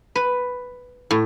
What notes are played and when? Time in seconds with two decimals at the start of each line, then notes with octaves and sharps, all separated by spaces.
0.16 B4
1.11 A2